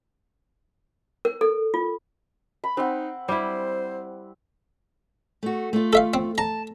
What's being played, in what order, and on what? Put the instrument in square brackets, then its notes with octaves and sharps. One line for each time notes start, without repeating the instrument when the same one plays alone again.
[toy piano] A#4
A4
F4
[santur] B5
[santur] C4 F#5 [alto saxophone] D#4
[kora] G3 E4 [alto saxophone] C5
[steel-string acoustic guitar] A3 F#4
A3 F4
[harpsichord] A4 E5 F5
C4
[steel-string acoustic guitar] A5 [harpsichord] A#5